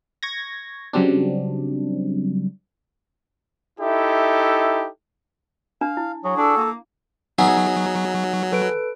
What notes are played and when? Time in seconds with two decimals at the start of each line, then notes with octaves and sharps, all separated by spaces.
0.23 C#6 G#6 A#6
0.93 C#3 F#3 G3 C4 D4
3.80 D#4 E4 G4 A4 E5
5.81 D4 F5
5.97 E4
6.24 F#3 F#4 G#4
6.37 D4 A4
6.57 A#3
7.38 F#3 B3 D#4 G#4 E5
8.52 A4 B4 D7